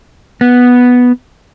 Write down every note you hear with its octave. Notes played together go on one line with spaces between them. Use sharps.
B3